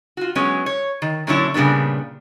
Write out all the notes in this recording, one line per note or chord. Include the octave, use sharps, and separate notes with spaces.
F4 F#4
F#3 G#3 B3 C#4
C#5
D#3
A#2 D3 F#3 C#4 D4 E4
A#2 C#3 G3 B3 D4